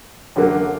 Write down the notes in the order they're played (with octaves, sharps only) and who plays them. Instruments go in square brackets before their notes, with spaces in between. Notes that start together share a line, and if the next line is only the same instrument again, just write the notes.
[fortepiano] F#2 D3 F#3 A#3